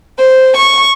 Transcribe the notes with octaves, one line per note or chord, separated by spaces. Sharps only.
C5
C#6